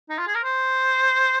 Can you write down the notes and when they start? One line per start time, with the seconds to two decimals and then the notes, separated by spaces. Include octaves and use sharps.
0.10 D#4
0.18 F4
0.27 G#4
0.35 A#4
0.44 C5